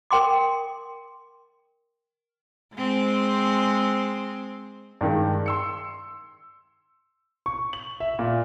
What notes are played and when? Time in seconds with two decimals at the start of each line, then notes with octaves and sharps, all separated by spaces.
0.11 A#4 G5 C6 D6
2.75 G#3 C4
5.01 G2 D#3 G#3
5.46 C6 E6 C#7
7.46 C#6
7.73 F#7
8.00 E5
8.19 A#2